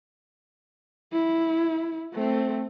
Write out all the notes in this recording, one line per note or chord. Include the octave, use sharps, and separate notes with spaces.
E4
A3 C4